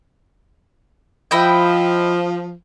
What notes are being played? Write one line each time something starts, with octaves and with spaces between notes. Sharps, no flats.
F3 E4 D#5 G5